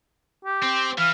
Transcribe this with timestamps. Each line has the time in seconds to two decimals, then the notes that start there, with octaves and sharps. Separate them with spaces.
0.45 G4
0.62 C4
0.98 E3 F5